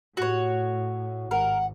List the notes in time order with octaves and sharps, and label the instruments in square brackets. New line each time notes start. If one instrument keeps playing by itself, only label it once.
[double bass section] A2 [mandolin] F#4 C#5
[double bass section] G#1 [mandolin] A#4 [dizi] F#5